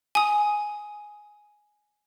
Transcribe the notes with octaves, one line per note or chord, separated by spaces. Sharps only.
G#5 D#6